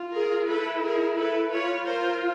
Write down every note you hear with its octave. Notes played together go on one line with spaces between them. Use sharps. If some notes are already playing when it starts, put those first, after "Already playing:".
Already playing: F4
G#4 A#4
E4 A4 B4
G#4 A#4
E4 A4 B4
F4 B4 C#5
F4 A#4 C5